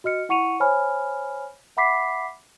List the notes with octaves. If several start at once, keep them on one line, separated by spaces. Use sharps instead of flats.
F#4 D#5 F6 C#7
E4 F#5 C#6 C#7 D#7 F7
C5 C#5 G#5 B5 F6
E5 F#5 B5 D6 B6 C7